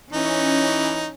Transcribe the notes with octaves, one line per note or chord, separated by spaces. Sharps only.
E3 C#4 D#4